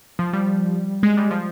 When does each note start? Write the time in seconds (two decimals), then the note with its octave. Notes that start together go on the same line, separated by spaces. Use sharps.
0.19 F3
0.33 G3
1.03 G#3
1.17 G3
1.31 F3